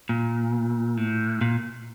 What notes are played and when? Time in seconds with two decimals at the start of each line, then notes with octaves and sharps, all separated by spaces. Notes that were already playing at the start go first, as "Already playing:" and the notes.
0.09 A#2
0.97 A2
1.41 A#2